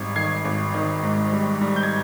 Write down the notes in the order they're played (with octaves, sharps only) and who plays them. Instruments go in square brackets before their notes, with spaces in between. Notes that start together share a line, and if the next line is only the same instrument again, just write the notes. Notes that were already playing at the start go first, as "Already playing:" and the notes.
Already playing: [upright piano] G#1 D#3 G3 G#6
D#3 G#6 C7
G#1
D#3
G#2
G3
G3
G6
G#6